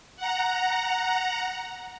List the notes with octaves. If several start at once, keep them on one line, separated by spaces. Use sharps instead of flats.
F#5 A#5